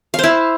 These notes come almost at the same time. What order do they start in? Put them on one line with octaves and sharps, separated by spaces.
F5 C5 E4